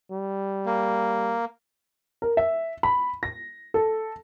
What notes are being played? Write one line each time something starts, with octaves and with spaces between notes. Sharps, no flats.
G3
A#3
A#4
E5
B5
A#6
A4